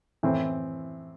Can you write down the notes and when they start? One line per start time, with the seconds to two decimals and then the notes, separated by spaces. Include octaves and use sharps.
0.23 A2 E3 C4